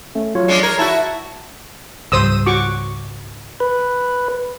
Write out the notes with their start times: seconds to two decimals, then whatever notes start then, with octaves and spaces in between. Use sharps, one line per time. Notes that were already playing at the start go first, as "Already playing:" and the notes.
0.15 A3 C#4
0.35 F#3 F4 C#5
0.48 G#3 C#4 D4
0.63 A#4 G#6
0.79 E4 F#4 A5
2.12 C#2 G#2 G3 C5 D#6 E6
2.46 F#4 C#6 D6
3.60 B4